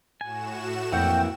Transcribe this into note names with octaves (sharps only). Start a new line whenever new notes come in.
A2 F#4 G#5 E7
F2 E3 A#3 E4 F#5 G5